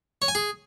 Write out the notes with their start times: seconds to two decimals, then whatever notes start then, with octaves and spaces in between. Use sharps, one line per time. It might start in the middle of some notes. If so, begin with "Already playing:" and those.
0.22 C#5
0.28 G#5
0.35 G#4